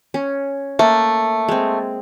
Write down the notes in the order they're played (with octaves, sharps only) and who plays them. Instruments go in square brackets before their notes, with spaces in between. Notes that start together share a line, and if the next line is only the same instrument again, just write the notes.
[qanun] C#4
[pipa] A3 [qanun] A#3
[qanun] G#3 C4